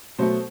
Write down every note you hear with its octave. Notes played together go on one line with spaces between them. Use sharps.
B2 F#3 A3 C5